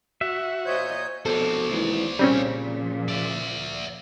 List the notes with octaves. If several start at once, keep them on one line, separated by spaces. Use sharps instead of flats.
F#4 E5
A#2 C5 C#5 D#5 G6
F2 B2 A4 C5 D5
D#2 G#2 E3
A#2 C#3 F3 G3 C4 C#4
D5 E5